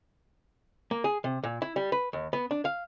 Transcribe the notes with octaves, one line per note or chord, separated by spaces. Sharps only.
A#3
G#4
C3
A#2
E4
G3
B4
D#2
B3
D4
F5